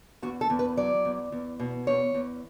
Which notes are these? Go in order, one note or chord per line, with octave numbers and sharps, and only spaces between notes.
E2 F#4
A4
E2
B4
F#3 D5
E2
E2
B2
E2 C#5
E2